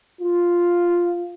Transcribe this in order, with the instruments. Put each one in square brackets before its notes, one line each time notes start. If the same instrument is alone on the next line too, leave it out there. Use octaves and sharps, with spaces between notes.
[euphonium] F4